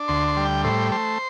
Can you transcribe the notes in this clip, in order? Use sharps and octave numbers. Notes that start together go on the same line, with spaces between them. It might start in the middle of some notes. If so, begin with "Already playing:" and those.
Already playing: D4
D2 C6
C6
G3
G5
A2 C5
A3 C5